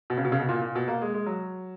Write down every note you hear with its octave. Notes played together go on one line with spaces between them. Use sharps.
B2
C#3
B2
C#3
B2
A#2
A#2
B2
A#3
G#3
G#3
F#3